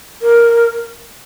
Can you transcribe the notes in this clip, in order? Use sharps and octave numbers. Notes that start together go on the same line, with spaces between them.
A#4